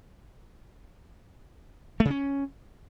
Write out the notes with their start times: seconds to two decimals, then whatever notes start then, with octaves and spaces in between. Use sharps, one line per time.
2.00 A3
2.05 C#3
2.10 C#4